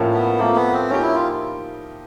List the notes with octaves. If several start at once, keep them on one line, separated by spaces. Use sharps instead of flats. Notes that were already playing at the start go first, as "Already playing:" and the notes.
Already playing: A2 F3 A#3 C#4
B3
F3 A3 A#3 C4
B3
C4
F3 A#3 C#4 D#4 G4
E4
F4